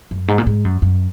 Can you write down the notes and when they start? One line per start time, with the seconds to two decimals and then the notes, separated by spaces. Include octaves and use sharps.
0.11 F#2
0.28 G#2
0.38 A#2
0.46 G#2
0.65 F#2
0.82 F#2